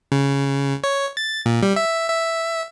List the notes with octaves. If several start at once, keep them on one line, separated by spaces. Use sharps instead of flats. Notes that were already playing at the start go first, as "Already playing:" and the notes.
C#3
C#5
A6
A#2
G3
E5
E5